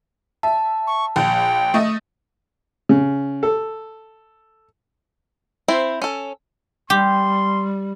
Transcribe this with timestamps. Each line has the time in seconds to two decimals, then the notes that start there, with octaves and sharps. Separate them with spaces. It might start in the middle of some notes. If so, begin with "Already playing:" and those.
0.43 E5 A5
0.87 C#6
1.16 A#1 G5
1.74 A3 D#5 E5
2.89 C#3
3.43 A4
5.68 C4 E4 C5
6.02 C#4 A4
6.90 G3 G4 C6